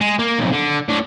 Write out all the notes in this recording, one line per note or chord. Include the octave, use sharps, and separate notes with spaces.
G#3
A#3
B1 F2
D3
A2 D4